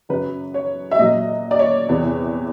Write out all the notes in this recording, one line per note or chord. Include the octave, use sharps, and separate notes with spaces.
F#2 C#3 F#3 B4
C#5
E5
A#2 F#3 D#5
D5
C#5
E2 C3 E3